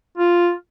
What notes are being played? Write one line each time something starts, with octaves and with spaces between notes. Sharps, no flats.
F4